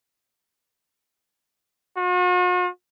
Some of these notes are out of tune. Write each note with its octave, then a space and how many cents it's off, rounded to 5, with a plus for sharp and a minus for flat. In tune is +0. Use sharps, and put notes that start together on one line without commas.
F#4 -45